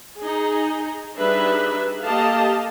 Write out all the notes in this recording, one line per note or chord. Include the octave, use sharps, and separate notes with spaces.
D#4 G#4
G3 D4 D#4 G#4 B4 E5
A#3 G4 A4 D#5 F5 A5